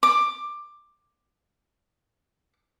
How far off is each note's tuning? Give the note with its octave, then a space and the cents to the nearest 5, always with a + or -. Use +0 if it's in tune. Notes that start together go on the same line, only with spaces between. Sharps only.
D6 +10